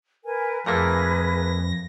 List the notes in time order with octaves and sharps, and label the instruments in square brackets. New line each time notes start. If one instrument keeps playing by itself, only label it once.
[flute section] A#4 B4 G#5
[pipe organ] F2 A#6 [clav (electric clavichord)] A#2 A3 A#3 [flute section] G#4 B4